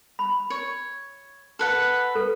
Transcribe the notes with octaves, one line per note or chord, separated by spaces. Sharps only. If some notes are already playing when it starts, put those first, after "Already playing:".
B5
C#5
A4 B4 F#5
A4 B4